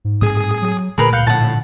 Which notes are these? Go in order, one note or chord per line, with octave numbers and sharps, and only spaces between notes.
G#2
A2 G3 C4 G#4 D#6
F#3
A#2 D3 A3 A#3 G#4 A#4 B4
C#2 A2 F5 F#6 G6 C#7
A2 D3 D#3 F3 F#5 A5